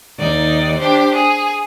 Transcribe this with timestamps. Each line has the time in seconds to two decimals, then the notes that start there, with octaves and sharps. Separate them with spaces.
0.18 D#2 D#4 D5
0.78 D4 G4 C5
1.13 G#4